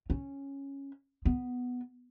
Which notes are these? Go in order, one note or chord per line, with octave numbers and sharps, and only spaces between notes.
C#4
B3